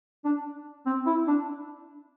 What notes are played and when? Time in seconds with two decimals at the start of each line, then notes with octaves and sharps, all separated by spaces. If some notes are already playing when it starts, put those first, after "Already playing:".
0.25 D4
0.86 C4
1.06 E4
1.27 D4